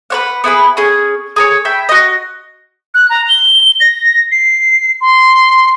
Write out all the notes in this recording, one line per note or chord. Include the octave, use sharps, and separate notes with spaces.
B4 C#5 F#5
B3 E4 G#4 B4
C#4 G#4
G#4 A#4 C#5
E5 G5 B5
F#4 D#5
F#6
A#5
G7
A#6
C7
C6